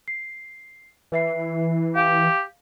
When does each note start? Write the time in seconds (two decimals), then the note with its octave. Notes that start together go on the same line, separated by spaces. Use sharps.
0.08 C7
1.12 E3 B4 E5 C7
1.96 G4 F5